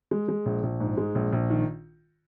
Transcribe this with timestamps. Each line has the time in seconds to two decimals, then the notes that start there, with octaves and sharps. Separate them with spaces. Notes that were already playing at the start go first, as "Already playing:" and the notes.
0.11 G#3
0.28 G#3
0.46 A#1
0.63 A#1
0.80 G#2
0.97 G#3
1.15 A#1
1.32 A#1
1.50 D#3